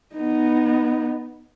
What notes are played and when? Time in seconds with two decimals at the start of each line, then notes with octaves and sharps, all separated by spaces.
0.15 B3 D#4